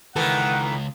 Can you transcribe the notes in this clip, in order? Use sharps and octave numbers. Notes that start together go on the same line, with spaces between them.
C#2 D#3 E3 A4 F#5